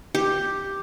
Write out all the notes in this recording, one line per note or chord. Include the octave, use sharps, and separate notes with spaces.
G4